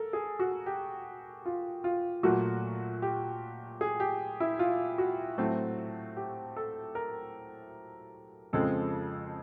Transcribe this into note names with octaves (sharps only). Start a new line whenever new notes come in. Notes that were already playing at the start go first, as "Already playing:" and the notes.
Already playing: A4 A#4
G#4
F#4
G4
F4
F4
A#2 F#3 A3 F#4
G4
G#4
G4
E4
F4
F#4
A2 F#3 A3 C4
G4
A4
A#4
F2 C#3 F3 G#3 C4 A4